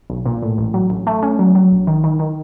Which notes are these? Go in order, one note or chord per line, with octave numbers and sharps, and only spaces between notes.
B1
A#2
A2
A1
F#3
A1
A3
C#4
F#3
F#3
A#1
D#3
D#3
D#3